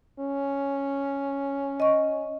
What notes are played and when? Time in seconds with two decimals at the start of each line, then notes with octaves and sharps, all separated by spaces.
0.19 C#4
1.80 D#5 C#6